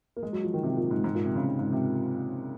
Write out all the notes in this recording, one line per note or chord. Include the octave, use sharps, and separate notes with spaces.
A#3
G#3
F#3
F3
D#3
C3
A#2
G#2
G#2
A#2
C3
C#3
G#2
G#2
C3